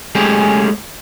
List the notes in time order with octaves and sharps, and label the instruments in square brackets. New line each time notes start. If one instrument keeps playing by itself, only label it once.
[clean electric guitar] G#3 A3 C#4 G4 G#4